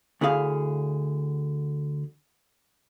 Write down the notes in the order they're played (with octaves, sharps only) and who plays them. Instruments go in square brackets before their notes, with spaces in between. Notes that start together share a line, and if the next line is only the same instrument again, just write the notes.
[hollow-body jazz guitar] D2 D3 E4 G#4 F5